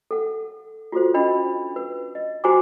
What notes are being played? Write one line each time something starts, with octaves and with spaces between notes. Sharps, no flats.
A4 F#5
F4 F#4 A4 C5
C#4 D4 D#5 B5
B4
D#5
F#4 G4 C5 G#5 A#5 D6